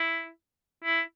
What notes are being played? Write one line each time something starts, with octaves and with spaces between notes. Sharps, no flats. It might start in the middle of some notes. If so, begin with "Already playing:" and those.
Already playing: E4
E4